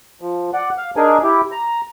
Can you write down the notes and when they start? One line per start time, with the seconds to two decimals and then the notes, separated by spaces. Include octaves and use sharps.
0.21 F3
0.53 D5 F#5
0.78 F5
0.96 D4 D#4 G#4 A#4 G#5
1.23 E4 G4
1.52 A#5